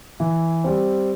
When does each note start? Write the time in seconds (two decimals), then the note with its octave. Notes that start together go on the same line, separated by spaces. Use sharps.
0.20 E3
0.64 G3 C4